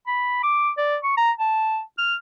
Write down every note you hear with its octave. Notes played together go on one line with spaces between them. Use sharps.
B5
D6
D5
C#6
A#5
A5
F6